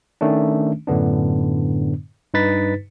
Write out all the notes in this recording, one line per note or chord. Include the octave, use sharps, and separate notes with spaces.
D#3 A3 C#4 D4
F#2 A2 D3 B3 D4
G2 D#4 B4 A6 B6